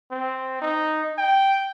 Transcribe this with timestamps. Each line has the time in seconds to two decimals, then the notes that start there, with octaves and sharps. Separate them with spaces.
0.11 C4
0.61 D#4
1.18 G5